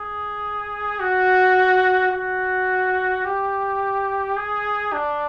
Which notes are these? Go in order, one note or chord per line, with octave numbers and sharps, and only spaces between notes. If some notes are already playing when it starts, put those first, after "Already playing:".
Already playing: G#4
F#4
F#4
G4
G#4
D4